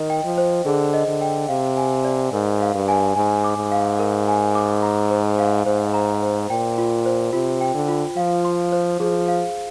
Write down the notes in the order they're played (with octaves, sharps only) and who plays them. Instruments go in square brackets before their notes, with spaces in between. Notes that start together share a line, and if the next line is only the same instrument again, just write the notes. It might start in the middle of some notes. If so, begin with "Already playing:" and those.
Already playing: [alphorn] D#3 [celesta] D#5
[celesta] G5
[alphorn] F3
[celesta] C5
[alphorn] D3 [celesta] G#4
[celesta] D#5
[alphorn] D3
[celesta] G5
[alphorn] C3 [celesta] F5
[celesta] G#5
D5
[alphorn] G#2 [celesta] A#4
[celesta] F5
[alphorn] G2
[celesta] G#5
[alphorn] G#2 [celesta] G#5
[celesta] D6
[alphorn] G#2
[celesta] F5
A#4
G#5
D6
A#5
C5
F5
[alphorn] G#2 [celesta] C5
[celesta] A#5
C5
[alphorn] A#2 [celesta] G5
[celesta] F4
C5
[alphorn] C3 [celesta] F4
[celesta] G5
[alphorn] D3
[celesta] F4
[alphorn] F3 [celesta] F5
[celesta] C6
C5
[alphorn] F3 [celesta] G#4
[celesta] F5